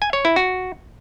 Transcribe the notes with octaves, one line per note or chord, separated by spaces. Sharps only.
G#5
C#5
E4
F#4